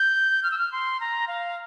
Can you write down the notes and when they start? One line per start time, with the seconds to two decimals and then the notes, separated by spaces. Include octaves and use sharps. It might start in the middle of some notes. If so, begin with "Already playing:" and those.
Already playing: G6
0.43 F6
0.51 E6
0.58 F6
0.72 C6
1.00 A#5
1.28 F5